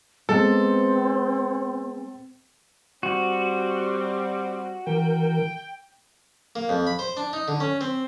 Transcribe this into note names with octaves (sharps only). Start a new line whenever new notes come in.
G#3 B3 C4 A4
G3 C4 F#4
E3 A#4 G5
A#3
F2
B5
C5
D4
D#4
D3
C#4
C4